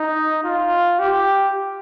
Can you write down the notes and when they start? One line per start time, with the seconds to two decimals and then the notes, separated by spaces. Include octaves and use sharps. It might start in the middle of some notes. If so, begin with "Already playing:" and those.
Already playing: D#4
0.44 F4
0.99 G4